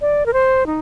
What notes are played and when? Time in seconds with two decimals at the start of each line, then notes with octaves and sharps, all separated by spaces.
0.01 D5
0.26 A#4
0.33 C5
0.66 D#4